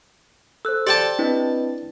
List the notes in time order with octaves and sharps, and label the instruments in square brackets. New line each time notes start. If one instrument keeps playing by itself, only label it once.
[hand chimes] A4 C5 [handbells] E6 F#6
[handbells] G4 [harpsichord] D5 G5 A5
[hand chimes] C4 B4 D#5 [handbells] D4 E4